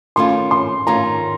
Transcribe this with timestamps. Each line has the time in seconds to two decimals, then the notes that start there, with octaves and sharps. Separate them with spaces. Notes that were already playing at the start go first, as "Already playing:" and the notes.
0.16 D#3 A3 C#4 F4 C6
0.51 C6
0.87 D#3 A3 C#4 F4 A#5